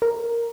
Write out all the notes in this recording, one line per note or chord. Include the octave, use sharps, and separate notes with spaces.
A#4